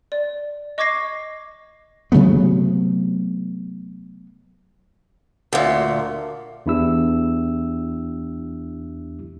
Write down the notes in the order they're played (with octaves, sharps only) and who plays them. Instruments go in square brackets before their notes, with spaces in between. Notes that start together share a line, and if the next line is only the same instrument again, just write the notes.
[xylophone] D5
D#5 C#6 D6 G#6 A#6 C7
[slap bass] C3 F#3 A3 B3
[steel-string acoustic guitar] D2 A#2
[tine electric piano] E2 D4 E4 G4 E6